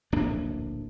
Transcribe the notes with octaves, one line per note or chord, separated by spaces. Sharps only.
D1 A#1 A#3 D4